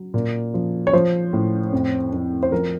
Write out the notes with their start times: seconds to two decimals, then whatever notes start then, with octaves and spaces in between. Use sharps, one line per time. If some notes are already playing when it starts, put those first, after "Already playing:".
Already playing: F#3
0.14 A#2
0.54 F3
0.87 C#5
0.93 F3 C5
1.33 A2
1.73 F2
2.13 F2
2.43 C5
2.52 F3 A#4